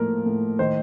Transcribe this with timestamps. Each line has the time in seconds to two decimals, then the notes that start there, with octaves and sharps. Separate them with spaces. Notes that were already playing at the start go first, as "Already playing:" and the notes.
Already playing: A2 F3 A#3 A#4
0.26 A2
0.59 D#3 C5